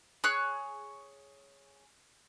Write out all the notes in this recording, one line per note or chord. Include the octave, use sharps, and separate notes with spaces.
G#4 C#5 F#6